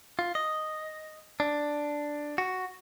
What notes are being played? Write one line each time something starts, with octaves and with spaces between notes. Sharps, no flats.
F4
D#5
D4
F#4